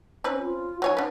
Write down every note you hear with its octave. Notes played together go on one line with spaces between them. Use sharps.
C4 C#4 B4
F4
F#3 C#5 F#5 G#5
D4 B4